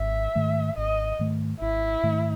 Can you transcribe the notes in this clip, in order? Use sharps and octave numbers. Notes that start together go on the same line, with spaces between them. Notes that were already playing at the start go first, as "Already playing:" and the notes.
Already playing: G#1 E5
G#2 D#3 A3
G#1 D#5
G#2 D#3 A3
G#1 E4
G#2 D#3 A3